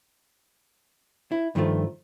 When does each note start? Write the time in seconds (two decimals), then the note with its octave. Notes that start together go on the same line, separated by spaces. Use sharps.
1.32 E4
1.55 G2 D#3 F3 G3 A3 F4